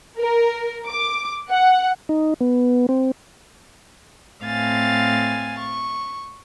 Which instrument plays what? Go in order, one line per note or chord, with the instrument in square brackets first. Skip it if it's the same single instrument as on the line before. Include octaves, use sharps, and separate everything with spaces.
[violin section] A#4
D6
F#5
[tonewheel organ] D#4
B3
C4
[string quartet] A2 C4 F5 G#5 A6
C#6